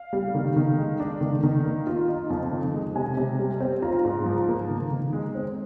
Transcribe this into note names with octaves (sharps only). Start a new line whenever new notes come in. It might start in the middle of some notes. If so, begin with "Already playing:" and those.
Already playing: F5
G3
D#3
D#3
G#3
D4
D#3
D#3
A#3
F4
D#4
F2
D#3
G#3
C3 G#5
C3
G3
C4
F4 A#5
G#2
F3
A#3
D#3
D#3
G#3
C4